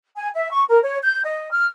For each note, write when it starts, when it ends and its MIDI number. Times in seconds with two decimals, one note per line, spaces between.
0.16 0.28 80
0.34 0.51 76
0.52 0.62 85
0.67 0.79 70
0.82 0.97 73
1.02 1.20 91
1.23 1.50 75
1.51 1.64 89